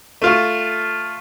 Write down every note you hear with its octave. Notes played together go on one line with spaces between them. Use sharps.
A3 F4